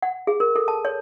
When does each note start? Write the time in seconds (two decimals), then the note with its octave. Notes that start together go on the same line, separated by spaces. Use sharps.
0.02 F#5
0.27 G#4
0.40 A#4
0.56 A4
0.68 A5
0.85 C#5